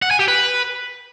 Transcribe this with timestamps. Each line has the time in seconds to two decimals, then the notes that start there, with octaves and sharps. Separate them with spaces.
0.02 F#5
0.11 G#5
0.19 G4
0.28 B4